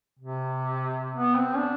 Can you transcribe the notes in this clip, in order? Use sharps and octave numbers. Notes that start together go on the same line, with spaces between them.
C3
B3
C4
D4